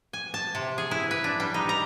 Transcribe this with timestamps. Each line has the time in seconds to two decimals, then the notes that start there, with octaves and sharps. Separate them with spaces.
0.13 G#5
0.34 A5
0.55 C3
0.78 G#4
0.91 E4
1.11 B4
1.24 D4
1.40 G3
1.54 D#4
1.69 A#5